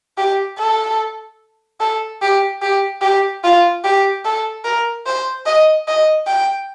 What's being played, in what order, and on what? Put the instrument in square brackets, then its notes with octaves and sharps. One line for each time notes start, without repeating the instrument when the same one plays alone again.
[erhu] G4
A4
A4
G4
G4
G4
F4
G4
A4
A#4
C5
D#5
D#5
G5